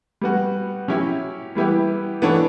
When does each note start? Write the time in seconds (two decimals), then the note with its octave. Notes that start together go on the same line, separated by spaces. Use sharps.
0.21 G3 B3 F#4
0.88 F#3 C#4 E4 G4
1.55 E3 G3 B3 E4 G4
2.22 E3 B3 D4 A4 C#5